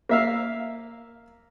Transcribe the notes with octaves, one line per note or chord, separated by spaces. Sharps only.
A#3 E5 F5